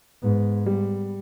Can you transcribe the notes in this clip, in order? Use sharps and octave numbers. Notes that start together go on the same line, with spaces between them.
G#2 B3
G3